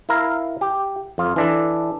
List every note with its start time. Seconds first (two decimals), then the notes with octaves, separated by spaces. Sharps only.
0.09 E4 A#4 F5 A#5
0.61 G4
1.18 F2 F4
1.36 E3 D4 A4